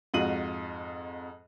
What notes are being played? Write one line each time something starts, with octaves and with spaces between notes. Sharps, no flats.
F2 G#2 F4 F#4 D#7 F#7